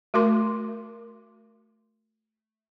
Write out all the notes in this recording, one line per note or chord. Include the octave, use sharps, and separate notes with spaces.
A3 F#4 A#4 C6 D6